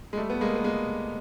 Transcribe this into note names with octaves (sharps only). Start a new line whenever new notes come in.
G#3
G3 A3
B3
G#3 A#3
B3
G#3 A#3